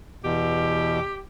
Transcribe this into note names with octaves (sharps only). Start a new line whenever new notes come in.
E2 B2 G4